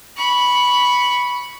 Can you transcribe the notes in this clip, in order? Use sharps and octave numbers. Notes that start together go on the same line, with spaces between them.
B5 C#6